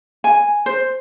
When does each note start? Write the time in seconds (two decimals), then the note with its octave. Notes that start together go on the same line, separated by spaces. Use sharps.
0.24 G#5
0.66 C5